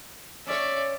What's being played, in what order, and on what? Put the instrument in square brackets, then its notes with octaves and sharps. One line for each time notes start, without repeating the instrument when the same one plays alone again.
[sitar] C#4 C#5 [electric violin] D5 E5